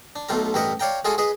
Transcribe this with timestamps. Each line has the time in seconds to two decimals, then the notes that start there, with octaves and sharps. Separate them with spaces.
0.16 D4
0.29 B1 B2 A3 F4 A#5
0.54 A1 G2 A#4 B4 D#5 F#5
0.80 C#5 D5 F5 G5 A#5
1.05 G#3 F4 F#4 G#4 A4
1.18 G#4 B4 D#5